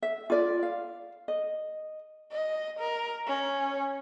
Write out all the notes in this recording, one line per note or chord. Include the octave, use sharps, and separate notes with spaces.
E5
F4 D5
F5
D#5
D#5
A#4
C#4